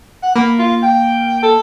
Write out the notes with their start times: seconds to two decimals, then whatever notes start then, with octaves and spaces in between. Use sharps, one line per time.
0.23 F#5
0.36 A#3 B5
0.59 F4
0.83 G5
1.43 A4